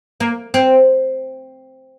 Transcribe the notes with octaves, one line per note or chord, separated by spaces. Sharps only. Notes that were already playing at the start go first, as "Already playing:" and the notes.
A#3
C4